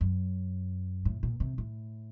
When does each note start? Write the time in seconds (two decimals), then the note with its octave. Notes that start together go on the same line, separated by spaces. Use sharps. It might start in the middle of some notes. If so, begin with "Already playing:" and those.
0.01 F#2
1.05 A2
1.23 A#2
1.40 C3
1.58 A2